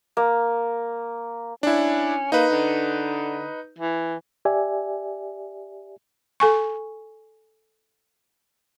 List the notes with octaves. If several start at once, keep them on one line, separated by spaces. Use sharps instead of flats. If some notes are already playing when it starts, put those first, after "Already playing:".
A#3
C#4 D4 E4
A#3 D#4 B4
D3
E3
G4 D5 E5 G#5
A4 G#5 C#6